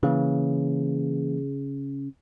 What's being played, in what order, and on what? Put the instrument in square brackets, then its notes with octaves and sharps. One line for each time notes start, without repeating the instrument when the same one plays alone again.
[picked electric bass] C#3 [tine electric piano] E3 A#3